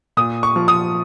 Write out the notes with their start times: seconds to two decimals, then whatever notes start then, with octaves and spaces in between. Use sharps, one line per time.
0.17 A#2 D#6
0.43 C#6
0.56 F3
0.68 D#6